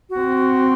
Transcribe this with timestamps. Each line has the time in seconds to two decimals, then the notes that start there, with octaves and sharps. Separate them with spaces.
0.10 F#4
0.20 C4